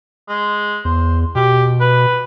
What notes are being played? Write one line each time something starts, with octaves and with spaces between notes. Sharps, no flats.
G#3
E2 C5
B2 G4
B4